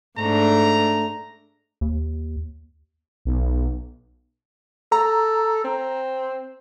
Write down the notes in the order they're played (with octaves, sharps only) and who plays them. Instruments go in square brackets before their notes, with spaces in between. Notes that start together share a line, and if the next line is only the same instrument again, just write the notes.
[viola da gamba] G#2 A3 D4 [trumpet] A#5
[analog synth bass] D#2
[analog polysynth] B1
[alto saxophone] A4 [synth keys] A#5
[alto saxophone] C4